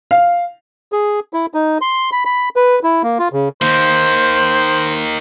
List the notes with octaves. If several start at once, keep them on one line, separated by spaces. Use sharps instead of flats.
F5
G#4
E4
D#4
C6
B5
B5
B4
E4
A#3
F4
C#3
D#3 A#3 C5